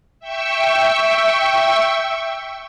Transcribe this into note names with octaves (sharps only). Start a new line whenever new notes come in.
E5 G5 C#6 E6